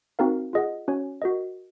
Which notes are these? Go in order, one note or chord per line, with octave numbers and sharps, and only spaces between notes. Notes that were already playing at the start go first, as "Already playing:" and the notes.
C4 D#4 F#4 A#4 F5
F4 G#4 D#5 F#5
C#4 F#4 C#5 G#5
F#4 A#4 D#5